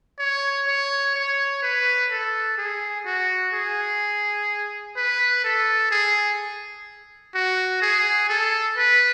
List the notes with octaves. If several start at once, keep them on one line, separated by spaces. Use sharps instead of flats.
C#5
C#5
C#5
B4
A4
G#4
F#4
G#4
B4
A4
G#4
F#4
G#4
A4
B4